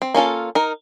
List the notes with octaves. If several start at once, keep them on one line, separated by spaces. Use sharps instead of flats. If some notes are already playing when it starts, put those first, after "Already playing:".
C4
A#3 C#4 F4 A4
D#4 A#4